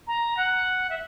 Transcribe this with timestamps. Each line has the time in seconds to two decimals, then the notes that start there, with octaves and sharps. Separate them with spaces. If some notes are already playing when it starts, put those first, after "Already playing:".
0.07 A#5
0.37 F#5
0.90 E5